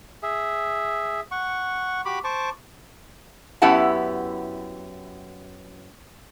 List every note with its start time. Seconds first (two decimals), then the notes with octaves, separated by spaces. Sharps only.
0.23 G#4 E5
1.32 F#5 C#6
2.05 F#4 G4 B5 D6
2.24 C5 A5 C#6 D6
3.62 F#2 B3 E4 G4 F#5 A5